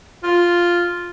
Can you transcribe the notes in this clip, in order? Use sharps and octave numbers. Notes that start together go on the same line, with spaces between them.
F4